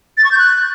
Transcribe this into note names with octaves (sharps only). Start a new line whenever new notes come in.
A6
C#6
G6
F#6